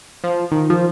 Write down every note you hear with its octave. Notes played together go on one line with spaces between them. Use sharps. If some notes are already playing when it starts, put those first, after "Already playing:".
F3
D#3
F3